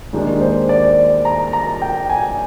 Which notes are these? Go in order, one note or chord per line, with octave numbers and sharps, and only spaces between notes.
D#2 D#3 G#3 D4
C5
D5
A#5
A#5
G5
G#5